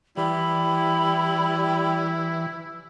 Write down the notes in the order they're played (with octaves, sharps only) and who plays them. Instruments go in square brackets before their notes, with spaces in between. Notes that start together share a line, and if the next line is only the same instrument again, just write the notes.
[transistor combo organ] E3 [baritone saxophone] G3 [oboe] E4 [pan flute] B5